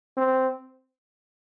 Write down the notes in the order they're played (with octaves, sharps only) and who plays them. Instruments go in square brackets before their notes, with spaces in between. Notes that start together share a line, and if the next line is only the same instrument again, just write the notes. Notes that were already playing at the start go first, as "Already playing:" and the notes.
[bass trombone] C4